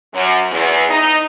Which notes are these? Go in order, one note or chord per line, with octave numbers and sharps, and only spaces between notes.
F#2
E2
D#4